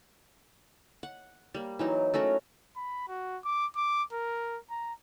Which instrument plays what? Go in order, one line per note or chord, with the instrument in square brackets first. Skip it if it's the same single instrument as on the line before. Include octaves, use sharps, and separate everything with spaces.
[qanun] F#5
G3 A#3
E3 F#3 D#4
A3 C#4 F#4 A#4
[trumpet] B5
F#4
D6
D6
A#4
A#5